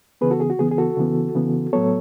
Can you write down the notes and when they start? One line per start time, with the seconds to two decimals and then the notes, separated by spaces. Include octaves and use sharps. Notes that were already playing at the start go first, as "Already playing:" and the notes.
0.21 C#3 E3 B3 G#4 B4
0.31 F#4 A4
0.40 G#4
0.50 F#4
0.59 C#3 E3 B3 G#4
0.71 G#4
0.78 F#4 A4
0.97 C#3 E3 B3
1.35 C#3 E3 B3
1.73 A2 F#3 B3 A4 C#5